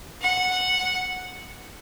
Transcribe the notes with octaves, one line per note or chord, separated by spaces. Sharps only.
F#5